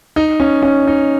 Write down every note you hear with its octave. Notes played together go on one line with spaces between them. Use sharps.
D#4
C#4
C#4
D#4